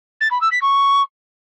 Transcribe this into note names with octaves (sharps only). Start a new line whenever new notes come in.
A6
B5
E6
B6
C#6